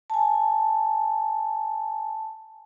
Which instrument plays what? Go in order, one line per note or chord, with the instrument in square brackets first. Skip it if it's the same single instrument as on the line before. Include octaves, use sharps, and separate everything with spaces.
[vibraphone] G#5 A5